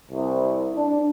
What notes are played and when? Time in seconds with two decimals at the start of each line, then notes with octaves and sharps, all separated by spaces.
0.11 C2
0.74 D4